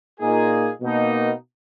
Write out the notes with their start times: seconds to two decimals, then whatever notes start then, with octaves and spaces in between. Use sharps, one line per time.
0.20 A#2 A#3 D#4 G#4
0.81 B2 A#3 D#4